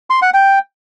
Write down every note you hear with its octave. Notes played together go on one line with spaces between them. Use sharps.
C6
F#5
G5